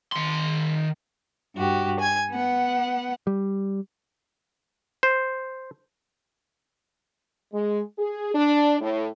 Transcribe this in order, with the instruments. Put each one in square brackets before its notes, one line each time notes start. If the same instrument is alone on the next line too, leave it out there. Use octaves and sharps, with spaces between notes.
[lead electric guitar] D#3 C6
[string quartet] G2 F#4 G4
G#5 G#6
B3 F#5
[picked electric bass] G3
[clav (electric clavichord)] C5
[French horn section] G#3
G#4
D4
A2